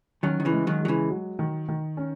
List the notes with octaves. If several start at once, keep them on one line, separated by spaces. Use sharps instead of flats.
D#3 F#3 C#4
D#3
C#3 E3
G#3
D#3 F#3
F#3 G#3
C#3 E3
F#3
D#3
D#3
C#4